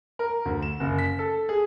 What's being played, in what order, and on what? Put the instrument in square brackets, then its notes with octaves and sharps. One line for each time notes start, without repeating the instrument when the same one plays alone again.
[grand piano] A#4
D2
E7
F#1
B6
A4
G#4